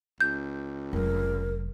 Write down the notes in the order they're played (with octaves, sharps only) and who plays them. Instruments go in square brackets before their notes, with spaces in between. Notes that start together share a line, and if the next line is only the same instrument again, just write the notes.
[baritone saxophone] C#2 [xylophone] G6
[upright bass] F1 F#3 [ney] A#4